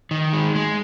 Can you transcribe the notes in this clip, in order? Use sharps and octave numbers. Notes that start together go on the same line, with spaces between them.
D#3
G#3
G#3